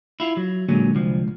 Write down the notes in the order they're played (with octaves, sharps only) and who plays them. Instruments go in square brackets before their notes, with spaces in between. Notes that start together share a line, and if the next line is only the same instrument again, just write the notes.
[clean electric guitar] E4 F4
F#3
[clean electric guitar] A#2 F#3 C#4 [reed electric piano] D3 G#3
[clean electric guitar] C2 F3